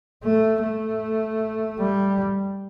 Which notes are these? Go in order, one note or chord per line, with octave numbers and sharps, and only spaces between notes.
A3
A3
G3